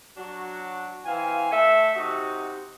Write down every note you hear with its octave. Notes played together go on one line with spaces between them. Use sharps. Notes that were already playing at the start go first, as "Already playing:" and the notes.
F#3 D4 F#4
E3 C4 F5 G#5
A3 A4 E5
C3 D#4 F#4